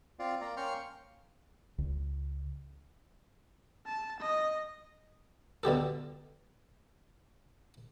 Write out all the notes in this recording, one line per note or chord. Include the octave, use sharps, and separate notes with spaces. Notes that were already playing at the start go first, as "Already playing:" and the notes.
C4 F4 D5 F5
A#3 D5 A#5
A#3 C#4 G5 C6 C#6 F6
C#2
A5
D#5
B2 D3 G4 A4